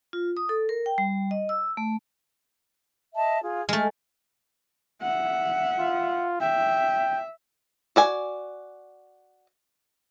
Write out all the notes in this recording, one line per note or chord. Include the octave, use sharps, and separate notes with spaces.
F4
D#6
A4
A#4
G5
G3
D#5
E6
A3
D#5 E5 A5
F4 G#4
G#3 A3 F6
E5 F#5
F4
E5 G5
F#4 D5 G#5